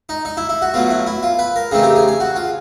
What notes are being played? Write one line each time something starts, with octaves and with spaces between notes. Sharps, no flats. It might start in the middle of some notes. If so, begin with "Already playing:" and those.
D#4
D#4
E4
E4
F#4
B2 F#3 A3 F4
E4
E4
F4
B4
A#4
C#3 E3 A3 C4 D#4 G#4
G4
G#4
G#4
F#4
F4